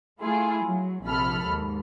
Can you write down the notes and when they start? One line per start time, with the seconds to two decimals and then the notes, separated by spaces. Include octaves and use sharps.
0.20 A3 E4 F4 G#4
0.64 F#3
1.04 A#1 C3 A4 B5 F6
1.45 D#2 G#2